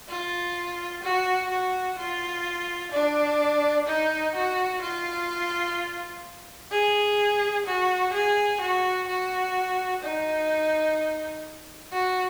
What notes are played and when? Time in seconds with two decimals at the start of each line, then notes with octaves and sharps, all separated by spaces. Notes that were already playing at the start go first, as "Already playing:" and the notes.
0.09 F4
1.03 F#4
1.50 F#4
1.98 F4
2.92 D4
3.87 D#4
4.35 F#4
4.82 F4
6.71 G#4
7.66 F#4
8.13 G#4
8.61 F#4
9.08 F#4
10.03 D#4
11.92 F#4